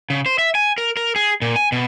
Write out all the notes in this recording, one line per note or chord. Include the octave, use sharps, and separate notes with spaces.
C#3
C5
E5
G#5
A#4
A#4
G#4
A#2
G#5
B2